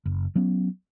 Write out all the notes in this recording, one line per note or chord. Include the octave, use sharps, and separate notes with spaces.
F#1
F#3 B3 C#4